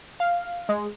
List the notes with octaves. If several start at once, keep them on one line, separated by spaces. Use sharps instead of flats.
F5
G#3